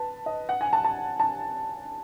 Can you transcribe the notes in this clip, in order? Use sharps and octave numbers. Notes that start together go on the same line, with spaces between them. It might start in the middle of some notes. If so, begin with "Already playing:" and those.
Already playing: B4 A5
D#5
F#5
G#5
A5
A5
A5